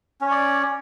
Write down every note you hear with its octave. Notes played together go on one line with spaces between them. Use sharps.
C#4 C#5 D5